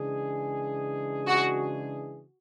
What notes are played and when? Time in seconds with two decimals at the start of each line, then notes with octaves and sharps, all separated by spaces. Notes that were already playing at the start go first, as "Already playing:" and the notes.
Already playing: C#3 E3 G#3 D4 G#4
1.27 F#4